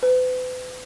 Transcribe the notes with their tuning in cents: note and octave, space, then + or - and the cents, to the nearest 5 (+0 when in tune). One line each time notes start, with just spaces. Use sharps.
B4 +40